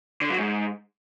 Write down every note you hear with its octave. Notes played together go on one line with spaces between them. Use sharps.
D3
F#3
G#2